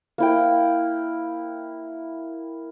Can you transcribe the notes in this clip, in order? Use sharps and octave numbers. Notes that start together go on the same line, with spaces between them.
A#3 E4 G5